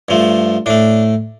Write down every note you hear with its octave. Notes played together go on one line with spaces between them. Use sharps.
G2 F3 A3
A2 A3 D4